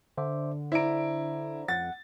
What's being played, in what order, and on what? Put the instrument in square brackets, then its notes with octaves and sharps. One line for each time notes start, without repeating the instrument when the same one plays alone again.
[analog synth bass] D3 [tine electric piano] C5 E5 D6
[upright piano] E4 D7 [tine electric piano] C5 D5 A#5
[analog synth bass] F2 [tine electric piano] F#5 [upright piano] A6